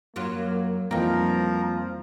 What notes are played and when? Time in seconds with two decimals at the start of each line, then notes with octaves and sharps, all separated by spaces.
0.16 F#2 F#3 A#3 F4
0.91 F2 E3 F3 G3 A#3 D#4 A#4